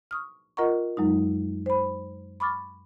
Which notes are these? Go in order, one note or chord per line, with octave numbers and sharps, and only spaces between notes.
C#6 D#6 F6
F4 A#4 D#5 F#5 A#5 C#6
F#2 F#3 G#3 D#4
C5 B5
B5 C#6 D6 F6 A6